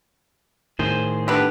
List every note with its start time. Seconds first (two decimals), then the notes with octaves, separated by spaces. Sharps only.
0.79 A2 D#3 G#4 C5
1.28 D3 B3 G4 B4